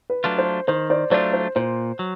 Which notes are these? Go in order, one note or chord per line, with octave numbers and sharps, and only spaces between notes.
B4
F#3 A3 D4 F4
C5
D#3 C5
C5 D5
F#3 A3 D4 F4 C5 D5
C5
A#2 C5
F#3